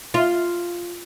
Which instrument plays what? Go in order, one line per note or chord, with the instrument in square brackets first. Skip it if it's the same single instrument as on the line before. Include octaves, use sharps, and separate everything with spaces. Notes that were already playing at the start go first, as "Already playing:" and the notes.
[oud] F4